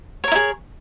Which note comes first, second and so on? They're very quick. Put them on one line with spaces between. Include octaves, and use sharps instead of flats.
C#5 A#4 E4 G#4